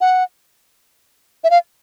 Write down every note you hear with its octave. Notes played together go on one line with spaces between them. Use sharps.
F#5
E5
F5